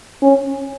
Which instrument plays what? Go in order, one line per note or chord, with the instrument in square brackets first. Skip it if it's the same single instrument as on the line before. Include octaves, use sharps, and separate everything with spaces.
[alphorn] C#4